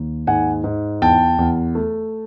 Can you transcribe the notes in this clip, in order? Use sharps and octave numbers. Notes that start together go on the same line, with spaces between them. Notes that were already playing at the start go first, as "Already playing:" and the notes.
Already playing: D#2
G#2 F#5 G#5
G#2
E2 G5 A5
E2
A3